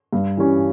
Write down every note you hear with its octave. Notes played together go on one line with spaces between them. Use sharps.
G2
E3 G3 C#4